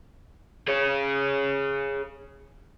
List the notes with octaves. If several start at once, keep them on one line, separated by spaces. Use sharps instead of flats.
G#4 C#5